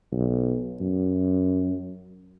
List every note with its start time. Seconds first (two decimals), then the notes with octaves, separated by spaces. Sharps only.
0.12 B1
0.81 F#2